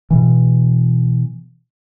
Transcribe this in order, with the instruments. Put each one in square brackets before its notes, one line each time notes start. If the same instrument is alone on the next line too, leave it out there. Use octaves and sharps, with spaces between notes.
[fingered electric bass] B2 E3